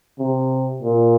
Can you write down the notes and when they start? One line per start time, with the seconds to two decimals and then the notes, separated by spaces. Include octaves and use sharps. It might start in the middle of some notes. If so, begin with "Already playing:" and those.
0.19 C3
0.82 A#2